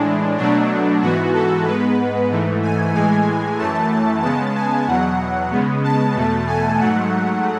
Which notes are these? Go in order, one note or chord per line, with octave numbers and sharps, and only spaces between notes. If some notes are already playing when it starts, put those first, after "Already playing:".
Already playing: A2 E3 G#3 D4
B2 F#3 A3 D4
G#2 E3 B3 F#4
A4
G#2 G#3 B3 B4
G#2 E3 A3
G#5
A2 E3 G#3 G#5
F#2 E3 A3 A5
C#3 G#3 B3 A5
G#5
E2 B2 F#3 F#5
C#3 G#3 B3
A5
E2 B2 A3
G#5
G#2 F#3 A3 F#5